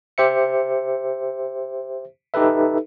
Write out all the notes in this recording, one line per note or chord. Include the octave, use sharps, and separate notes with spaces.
G4 C5 E5 C#7
D#4 G4 A4 B4 E5